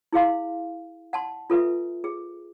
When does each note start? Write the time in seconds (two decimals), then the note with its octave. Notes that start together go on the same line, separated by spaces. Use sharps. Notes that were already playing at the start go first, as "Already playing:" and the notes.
0.13 E4 G#4 F5 C6
1.13 F#5 A5 C6
1.50 F4 A4 B4 E5
2.04 G#4